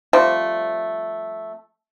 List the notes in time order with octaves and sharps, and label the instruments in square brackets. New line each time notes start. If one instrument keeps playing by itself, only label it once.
[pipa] F3 G3 A3 C4